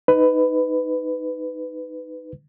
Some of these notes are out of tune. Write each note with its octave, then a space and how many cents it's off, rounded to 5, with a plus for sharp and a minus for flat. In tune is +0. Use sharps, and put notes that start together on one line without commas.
D#4 +0 B4 +15